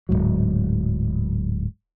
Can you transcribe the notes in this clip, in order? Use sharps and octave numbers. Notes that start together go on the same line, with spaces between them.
D1 G1 G#2 F#3